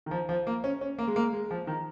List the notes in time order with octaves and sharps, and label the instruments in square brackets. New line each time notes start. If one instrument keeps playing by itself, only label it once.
[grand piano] D#3
F3
F3
A#3
C#4
C#4
A#3
G#3
A#3
G#3
F3
D#3